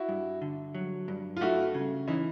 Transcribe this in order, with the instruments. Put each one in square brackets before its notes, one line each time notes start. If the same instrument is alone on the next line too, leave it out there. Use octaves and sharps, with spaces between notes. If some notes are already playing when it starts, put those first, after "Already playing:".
Already playing: [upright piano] E4 F#4
[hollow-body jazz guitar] G2
D3
F#3
G2
[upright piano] F4
[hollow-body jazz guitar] A3 [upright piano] E4 F#4
[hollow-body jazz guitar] C#3
[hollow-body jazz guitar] E3 [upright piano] C#4 D#4